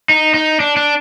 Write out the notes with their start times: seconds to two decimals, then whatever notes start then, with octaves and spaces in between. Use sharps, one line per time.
0.09 D#4
0.34 D#4
0.60 D4
0.77 D4